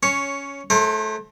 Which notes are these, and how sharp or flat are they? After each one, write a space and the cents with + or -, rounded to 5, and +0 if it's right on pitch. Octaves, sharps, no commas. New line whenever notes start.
C#4 +10 C#5 +0 C#6 +0
A3 -25 A4 +45 C5 +35